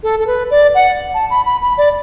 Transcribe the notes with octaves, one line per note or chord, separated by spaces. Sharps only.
A4
A4
B4
D5
F#5
A5
B5
B5
B5
D5